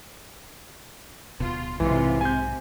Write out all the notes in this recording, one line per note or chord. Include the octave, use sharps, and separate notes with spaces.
D1 B2 F4
B1 G#2 C3 E3 F4
C3 G#5 G6